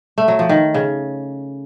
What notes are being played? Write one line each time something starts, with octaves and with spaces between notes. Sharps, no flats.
A3
F#3
F3
D#3
C#3